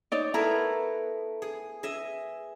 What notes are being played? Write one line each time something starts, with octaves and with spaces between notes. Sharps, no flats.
D#4 C#5 D5
A3 B3 E4 A#4 A#5
G#4
G#4 D#5 E5